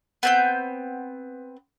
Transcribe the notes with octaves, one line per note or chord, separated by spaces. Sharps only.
B3 C4 G6